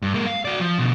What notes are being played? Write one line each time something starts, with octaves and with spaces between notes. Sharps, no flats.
G2
G#3 A#3
F5
F#4 D5
F3
B2 D3